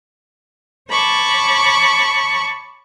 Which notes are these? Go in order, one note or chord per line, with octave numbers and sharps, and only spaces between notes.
C#5 A5 B5 C#6 D6